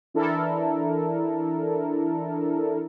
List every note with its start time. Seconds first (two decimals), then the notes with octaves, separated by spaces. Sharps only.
0.14 E3 D4 E4 A4 A#4